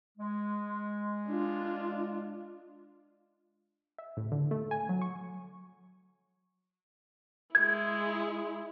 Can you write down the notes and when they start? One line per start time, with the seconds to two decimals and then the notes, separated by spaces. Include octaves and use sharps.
0.18 G#3
1.28 D4 F4
3.98 E5
4.17 A2
4.32 D3
4.51 A3
4.71 G#5
4.89 F#3
5.02 C#6
7.55 G#3 E4 G#6